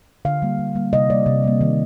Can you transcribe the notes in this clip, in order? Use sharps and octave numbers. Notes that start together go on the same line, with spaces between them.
D3 F5
G3 A#3
D3
G3 A#3
C3 D#5
G3 A#3 D5
C3
G3 A#3
D#3